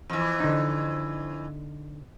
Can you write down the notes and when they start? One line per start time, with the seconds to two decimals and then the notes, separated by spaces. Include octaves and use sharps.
0.10 F2 E3
0.40 D3 D#4